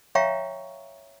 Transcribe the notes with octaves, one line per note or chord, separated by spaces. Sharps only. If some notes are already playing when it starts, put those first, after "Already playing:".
C#5 E5 F5 G5 A#5 C#6